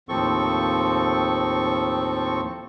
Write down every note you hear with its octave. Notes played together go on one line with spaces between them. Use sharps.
D#2 A2 F3 C4 A4 C#6